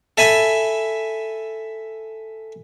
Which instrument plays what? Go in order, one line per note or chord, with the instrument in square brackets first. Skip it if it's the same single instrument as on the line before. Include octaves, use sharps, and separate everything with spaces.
[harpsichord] A4 E5 G#5 B5